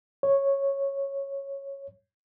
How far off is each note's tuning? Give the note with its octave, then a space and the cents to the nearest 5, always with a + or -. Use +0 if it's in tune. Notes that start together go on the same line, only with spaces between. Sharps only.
C#5 -5